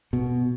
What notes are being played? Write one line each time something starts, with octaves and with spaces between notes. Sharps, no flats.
B2